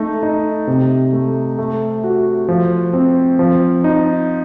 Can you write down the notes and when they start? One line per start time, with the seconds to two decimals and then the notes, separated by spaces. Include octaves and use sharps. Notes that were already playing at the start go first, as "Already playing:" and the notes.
Already playing: A3 D#4
0.23 D#4
0.67 C3
1.13 A3
1.59 A3
2.04 F#4
2.49 F3
2.93 C4
3.39 F3
3.84 D#4